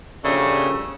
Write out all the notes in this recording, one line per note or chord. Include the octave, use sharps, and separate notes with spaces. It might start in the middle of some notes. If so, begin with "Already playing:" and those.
C#3 F3 G3 A3 A#3 D4